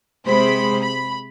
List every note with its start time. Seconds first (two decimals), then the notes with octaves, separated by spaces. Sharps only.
0.24 C3 G#3 C5 B5
0.82 B5